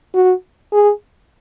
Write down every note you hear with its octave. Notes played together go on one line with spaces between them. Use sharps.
F#4
G#4